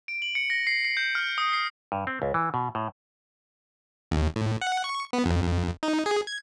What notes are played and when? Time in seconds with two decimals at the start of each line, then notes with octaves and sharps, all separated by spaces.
0.08 D7
0.22 F#7
0.35 C#7
0.50 A#6
0.67 C7
0.85 C7
0.97 G6
1.15 F6
1.38 D#6
1.53 C7
1.92 G2
2.07 C4
2.22 C#2
2.34 E3
2.54 B2
2.75 A2
4.11 D#2
4.36 A2
4.62 F#5
4.84 C#6
5.13 B3
5.25 F2
5.42 F2
5.83 D#4
6.06 G#4
6.27 G#6